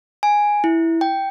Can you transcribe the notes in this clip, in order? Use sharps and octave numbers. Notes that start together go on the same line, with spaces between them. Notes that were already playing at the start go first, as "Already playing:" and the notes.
G#5
E4
G5